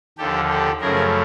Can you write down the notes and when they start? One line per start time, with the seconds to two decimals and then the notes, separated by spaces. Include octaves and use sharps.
0.18 D#2 D3 F3 G4 A4
0.49 G4 A4
0.81 F#2 C#3 F3 A3 G#4 A#4